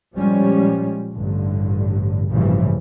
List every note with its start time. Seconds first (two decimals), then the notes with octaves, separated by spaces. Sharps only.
0.14 A#2 F3 G3 G#3 C#4
1.14 A1 G2 D3
2.29 A1 G2 A#2 C#3 E3 F3